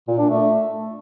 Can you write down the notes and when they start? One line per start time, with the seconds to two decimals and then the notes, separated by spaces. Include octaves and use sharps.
0.08 A#2
0.18 D4
0.29 A3